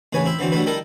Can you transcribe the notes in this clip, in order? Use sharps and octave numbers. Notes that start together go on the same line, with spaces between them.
A1 D#2 C#3 B4 C#5 G#5
C4 E4 E5
D3 E3 F#3 C4
D3 F#3 G3 A3 E4 B4
D#3 G3 E4 A4 A#4